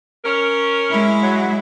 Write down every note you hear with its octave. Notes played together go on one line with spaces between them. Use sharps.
C#4 A#4
G#3 E4
F#3